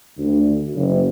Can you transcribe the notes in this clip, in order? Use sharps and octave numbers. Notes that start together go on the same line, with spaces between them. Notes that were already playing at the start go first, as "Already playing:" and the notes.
D2
F#1